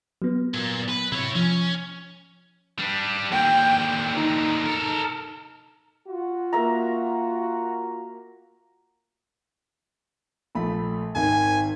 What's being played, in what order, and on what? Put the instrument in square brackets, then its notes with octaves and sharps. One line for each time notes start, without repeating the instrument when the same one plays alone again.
[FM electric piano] F#3 B3
[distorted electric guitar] A#2
B4
[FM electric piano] C3 [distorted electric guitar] E4 C#5
[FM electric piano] F3 [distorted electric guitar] C#4
[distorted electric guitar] G3 D4
[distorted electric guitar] D#2 D3 [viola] G5
[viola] D#4
[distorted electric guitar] A4 A#4
[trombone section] F4 F#4
[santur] A#3 E5 A#5
[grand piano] A#1 A3 B5
[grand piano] G#1 D#3 [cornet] G#5